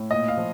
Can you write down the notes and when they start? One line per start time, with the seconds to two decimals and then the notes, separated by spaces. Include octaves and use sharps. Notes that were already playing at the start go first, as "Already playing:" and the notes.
Already playing: A2
0.11 A#2 D#5
0.28 F5
0.37 F3